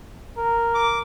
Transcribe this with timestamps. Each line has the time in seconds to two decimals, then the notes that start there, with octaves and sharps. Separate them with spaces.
0.37 A#4
0.74 D6